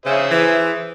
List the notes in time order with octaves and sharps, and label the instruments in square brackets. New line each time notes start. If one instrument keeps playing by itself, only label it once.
[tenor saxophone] C#3 [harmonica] G#4 C5 E5
[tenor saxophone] E3